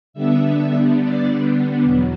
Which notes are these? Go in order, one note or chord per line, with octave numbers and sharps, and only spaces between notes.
D3 G3 B3 D4 E5
D5
E2 B2 F#3